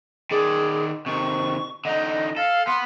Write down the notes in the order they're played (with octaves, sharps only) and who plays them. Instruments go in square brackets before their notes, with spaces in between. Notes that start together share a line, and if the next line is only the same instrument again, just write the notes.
[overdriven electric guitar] D#3 D5 [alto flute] G#4
[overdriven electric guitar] C3 D#3 [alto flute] C#6
[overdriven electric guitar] D3 D#4 [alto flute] D#5
[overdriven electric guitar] A4 [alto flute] F5
[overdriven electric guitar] B3 [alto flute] C6